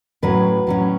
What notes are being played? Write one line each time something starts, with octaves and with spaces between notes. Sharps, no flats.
A2 F#3 C#4 B4
A2 F#3 C#4